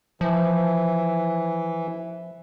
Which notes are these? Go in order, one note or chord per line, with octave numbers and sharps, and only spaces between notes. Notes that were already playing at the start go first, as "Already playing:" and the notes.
E3 F3